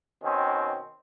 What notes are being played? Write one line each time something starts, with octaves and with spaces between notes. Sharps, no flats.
B2 D#3 C4 C#4